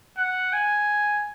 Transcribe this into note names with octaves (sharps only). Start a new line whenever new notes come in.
F#5
G#5